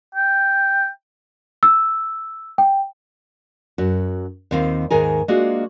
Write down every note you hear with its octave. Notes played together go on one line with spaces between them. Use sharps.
G5
E6
G5
F#2 F#4
D#2 D#3 C4 F4 F5
D#2 G#2 D#3 G#4 A#4 G#5
G#3 A#3 D4 F4 F#4 G#4